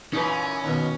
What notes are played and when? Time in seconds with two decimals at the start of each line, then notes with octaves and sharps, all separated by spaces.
0.13 F#2 A#2 E3 C#4 D#4 B4
0.64 D#2 B2